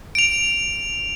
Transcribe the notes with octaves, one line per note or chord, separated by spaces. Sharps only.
D7 F7